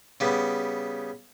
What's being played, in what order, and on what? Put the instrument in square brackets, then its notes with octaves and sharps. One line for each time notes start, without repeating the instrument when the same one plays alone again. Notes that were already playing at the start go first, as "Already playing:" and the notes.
[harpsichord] C#3 G3 B3